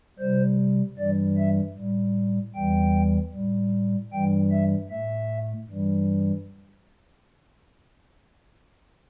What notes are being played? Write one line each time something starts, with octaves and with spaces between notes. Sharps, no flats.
C3 G3 C5
G2 E3 G3 D5
E5
A2 G3
E2 E3 G3 G5
A2 G3
G2 E3 G3 G5
E5
A2 A3 E5
G2 E3 G3